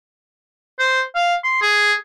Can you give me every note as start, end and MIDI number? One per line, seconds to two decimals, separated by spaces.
0.79 1.02 72
1.15 1.35 77
1.44 1.60 84
1.62 1.93 68